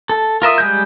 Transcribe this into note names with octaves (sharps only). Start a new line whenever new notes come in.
A4
F4 A#4 E5 D#6
G3 G#3 G6